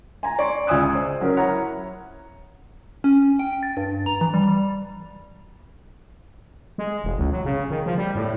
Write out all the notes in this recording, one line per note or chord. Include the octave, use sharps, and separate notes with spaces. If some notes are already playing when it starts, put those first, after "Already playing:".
G#5 A#5
D5 C6 C#6
C#2 D5 G#5 D#6 E6 F#6
C5
F#3 C#4 A#4
E4 C#5 F#5 A#5
C#4
G5
A6
G2
A#5
E3
G3
G3
G#3
E1
C#2
F#3
C#3
D#3
F3
G3
A2